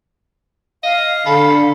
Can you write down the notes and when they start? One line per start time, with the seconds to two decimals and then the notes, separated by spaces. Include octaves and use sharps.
0.83 D#5 F5
1.26 D3 A4 B5